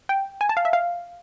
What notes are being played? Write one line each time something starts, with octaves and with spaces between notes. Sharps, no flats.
G5
G#5
A5
F5
E5
F5